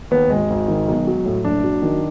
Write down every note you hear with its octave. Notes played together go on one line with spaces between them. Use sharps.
D#2 B3
G#1 G#3
G#1
D#3
B1
F#3
A2
F#1 D4
F#3
D#3